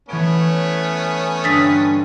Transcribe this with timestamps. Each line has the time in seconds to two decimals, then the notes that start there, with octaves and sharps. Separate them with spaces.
0.09 E3 A3 B3 C#4 C#5 D7
1.44 G2 D3 D#6 A6 B6